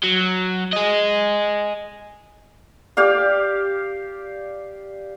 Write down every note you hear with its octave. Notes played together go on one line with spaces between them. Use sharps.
F#3
G#4 D#5
G4 D5 F5